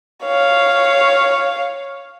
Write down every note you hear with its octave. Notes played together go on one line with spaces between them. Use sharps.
C#5 F5